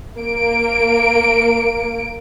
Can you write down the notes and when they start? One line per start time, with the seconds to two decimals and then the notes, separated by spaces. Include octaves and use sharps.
0.18 A#3 D7